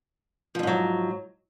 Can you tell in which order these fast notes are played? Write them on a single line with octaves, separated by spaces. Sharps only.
F3 F2 G#2 F#3